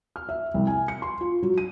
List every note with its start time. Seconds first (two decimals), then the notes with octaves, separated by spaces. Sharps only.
0.16 F6
0.29 E5
0.54 C2
0.67 G#5
0.88 C#7
1.02 C6
1.21 F4
1.42 F#3
1.58 D#7